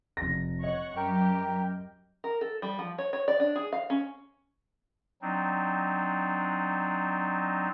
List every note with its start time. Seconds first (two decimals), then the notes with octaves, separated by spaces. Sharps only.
0.17 F1 A#6
0.64 C#5 D#5 F#5 C#6
0.97 F#2 G4 A#4 G5
2.24 A#4
2.41 A4
2.62 G3
2.79 F3
2.98 C#5
3.13 C#5
3.28 D5
3.40 D4
3.55 G#4
3.73 F5
3.90 C#4
5.22 F#3 C4 D4 D#4